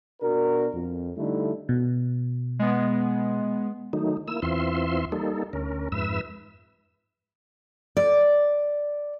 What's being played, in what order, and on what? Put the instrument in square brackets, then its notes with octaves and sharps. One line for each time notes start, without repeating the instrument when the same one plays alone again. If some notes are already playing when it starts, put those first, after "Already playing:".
[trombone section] B2 D4 F#4 A#4
F2
D3 G3 A3 D#4 E4
[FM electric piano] B2
[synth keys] G#3 B3
[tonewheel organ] D#3 F#3 A3 D#4
A#3 E4 E6
E2 E3 C4 F4 E5 C6
G3 A#3 D#4 A4
D2 C#4 A#4
F2 G#2 B4 E5 E6
[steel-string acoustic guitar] D5